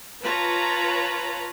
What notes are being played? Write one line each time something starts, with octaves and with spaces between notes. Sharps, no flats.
F4 B4 C#5 A5 A#5